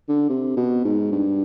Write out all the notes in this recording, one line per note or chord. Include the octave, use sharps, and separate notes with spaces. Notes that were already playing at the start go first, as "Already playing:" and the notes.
D3
C3
B2
G#2
G2